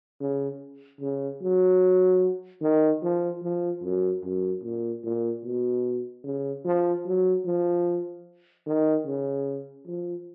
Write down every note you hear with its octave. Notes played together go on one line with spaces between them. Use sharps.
C#3
C#3
F#3
D#3
F3
F3
F#2
F#2
A#2
A#2
B2
C#3
F3
F#3
F3
D#3
C#3
F3